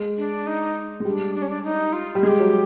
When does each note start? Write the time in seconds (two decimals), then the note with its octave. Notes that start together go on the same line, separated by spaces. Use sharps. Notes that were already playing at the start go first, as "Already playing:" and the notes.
Already playing: G#3
0.17 D4
0.47 D#4
1.00 G#3
1.05 G3 D4
1.35 D4
1.42 C#4
1.49 D4
1.64 D#4
1.93 F4
2.15 G3
2.23 G#3 G#4
2.28 G4
2.40 F#3